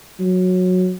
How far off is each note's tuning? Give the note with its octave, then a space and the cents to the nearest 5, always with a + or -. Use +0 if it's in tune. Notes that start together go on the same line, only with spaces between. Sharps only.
F#3 -15